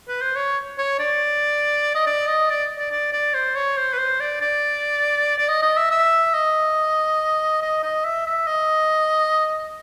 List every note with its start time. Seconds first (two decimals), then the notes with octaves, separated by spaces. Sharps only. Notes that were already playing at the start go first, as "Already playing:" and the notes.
0.08 B4
0.21 C5
0.36 C#5
0.78 C#5
0.99 D5
1.95 D#5
2.07 D5
2.28 D#5
2.50 D5
2.78 D5
2.92 D5
3.13 D5
3.34 C5
3.55 C#5
3.77 C5
3.93 B4
3.99 C5
4.20 D5
4.41 D5
5.38 D5
5.49 D#5
5.62 D#5
5.77 E5
5.91 E5
6.34 D#5
7.62 D#5
7.83 D#5
8.04 E5
8.26 E5
8.47 D#5